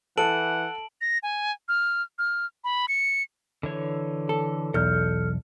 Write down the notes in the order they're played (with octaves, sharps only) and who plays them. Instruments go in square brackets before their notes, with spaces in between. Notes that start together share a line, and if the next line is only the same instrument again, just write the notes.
[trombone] E3 [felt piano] A4 [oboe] F#5 [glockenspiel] A5 D7 F#7
[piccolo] A#6
G#5
F6
F6
B5
C#7
[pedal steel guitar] D3 E3 C#5
[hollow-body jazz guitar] A4
[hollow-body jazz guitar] B1 E2 [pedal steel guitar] A4 F6 G6